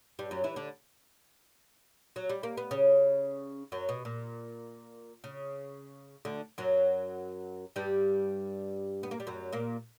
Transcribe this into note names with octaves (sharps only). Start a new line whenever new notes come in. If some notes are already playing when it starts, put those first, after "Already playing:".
G2 G3
F#2 F#3
E3 E4
D3 D4
F#3
G3
A#3
B3
C#3 C#4
F#2 F#3
B2
A#2
C#3
D2 D3
F#2 F#3
G2 G3
B3
A#3
G3
F#2 F#3
A#2 A#3